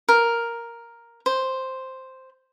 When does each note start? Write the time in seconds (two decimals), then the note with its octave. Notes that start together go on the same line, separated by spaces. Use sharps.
0.09 A#4
1.26 C5